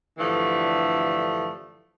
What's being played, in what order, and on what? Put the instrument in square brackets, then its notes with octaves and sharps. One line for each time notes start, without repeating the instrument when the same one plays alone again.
[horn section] G2 D3 E3 F3 A3